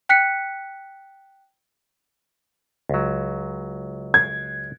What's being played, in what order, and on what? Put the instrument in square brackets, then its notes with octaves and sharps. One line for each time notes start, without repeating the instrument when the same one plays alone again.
[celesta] G5 F#6 B6 C#7
[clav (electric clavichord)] C#2 F#3
[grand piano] G#6